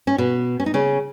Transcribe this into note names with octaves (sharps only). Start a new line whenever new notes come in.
C#4
B2 B3
C#4
D#4
C#3 C#4